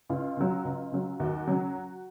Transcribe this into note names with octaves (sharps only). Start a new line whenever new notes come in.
C#2 F4
C#3 F#3
C#2
C#3 F#3
D#2 F#4
C#3 F#3